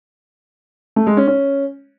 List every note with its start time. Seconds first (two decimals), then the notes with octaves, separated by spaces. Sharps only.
0.96 A3
1.07 G#3
1.17 C#4
1.27 C#4